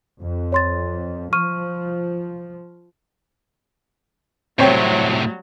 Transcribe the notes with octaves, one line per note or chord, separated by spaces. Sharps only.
F2
C#5 C6 A6
F3 C#6 F6 D#7
A2 C3 F#3 G3 C4 C#5 G5